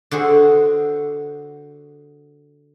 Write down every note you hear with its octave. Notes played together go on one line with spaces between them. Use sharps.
D3 F#4 G#4 C5